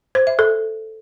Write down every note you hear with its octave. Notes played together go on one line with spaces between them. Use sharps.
C5
E5
A4